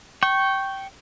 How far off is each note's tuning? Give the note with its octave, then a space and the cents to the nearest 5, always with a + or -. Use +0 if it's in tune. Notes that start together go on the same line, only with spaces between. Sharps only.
G5 -15 C#6 -10